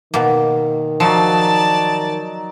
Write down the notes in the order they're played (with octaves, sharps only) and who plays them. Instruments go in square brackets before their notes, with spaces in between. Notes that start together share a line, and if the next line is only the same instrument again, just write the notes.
[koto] B2 A#3 [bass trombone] D#3
[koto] F3 [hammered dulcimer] F#3 D#4 [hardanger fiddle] D5 A5